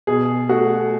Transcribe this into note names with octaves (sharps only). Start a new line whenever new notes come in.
B2 G#4
A3 F#4